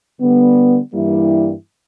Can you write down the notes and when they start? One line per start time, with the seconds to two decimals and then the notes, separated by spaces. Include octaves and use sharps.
0.20 D3 G3 B3
0.93 G2 E3 G3 A#3 E4